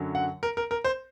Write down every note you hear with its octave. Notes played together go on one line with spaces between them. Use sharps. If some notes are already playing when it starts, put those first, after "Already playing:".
Already playing: F#2 D3 F#3
F#5
A#4
A#4
A#4
C5